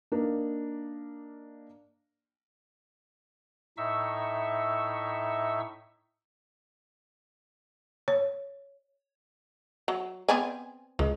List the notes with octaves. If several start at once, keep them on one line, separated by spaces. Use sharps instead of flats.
A#3 D4 D#4 A#4
A2 D#4 E5 C#6 E6
C#5
F#3
B3 C4 D5 G#5
C#2 G#3